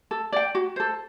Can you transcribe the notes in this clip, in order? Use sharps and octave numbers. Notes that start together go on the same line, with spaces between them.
A4
D5 G5
F#4
A4 C5